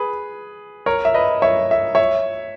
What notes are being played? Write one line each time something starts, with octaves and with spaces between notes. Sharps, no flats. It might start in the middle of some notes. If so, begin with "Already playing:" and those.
Already playing: G#4 B4
A#4 C#5
E5
B4 D#5
C#5 E5
E5
C#5 E5